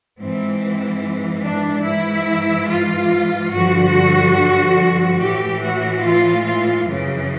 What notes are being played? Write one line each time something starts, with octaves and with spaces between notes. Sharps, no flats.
G#2 E3 C4
D4
G#2 E3 E4
F4
G2 D3 F3 F#4
A2 E3 G4
F#4
F4
F4
F#2 C#3 E3